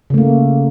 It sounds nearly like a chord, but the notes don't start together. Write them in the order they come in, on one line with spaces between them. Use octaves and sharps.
C#3 A3 A#3